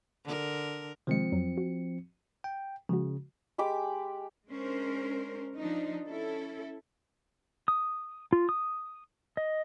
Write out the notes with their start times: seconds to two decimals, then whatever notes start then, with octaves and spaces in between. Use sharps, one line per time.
0.25 D3 A#4
1.07 C3 D#3 F3 G#3 C4 C#7
1.32 F2 F#3
1.58 F#4
2.44 G5
2.89 C#3 F3 G#3 F#4
3.58 G#3 G4 B5 D6
4.48 G#3 C#4 D4 A#4 C5
5.58 F3 D4 D#4
6.08 C#4 E4 A4
7.68 D#6
8.33 F4
8.49 D#6
9.37 D#5